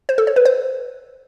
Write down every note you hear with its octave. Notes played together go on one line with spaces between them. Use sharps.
C5
A4
C#5
B4
C5